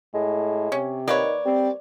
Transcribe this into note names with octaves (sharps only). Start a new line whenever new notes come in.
A2 G#3
C3 C#4
D#3 A#3 B4 C#5 D5
G3 C4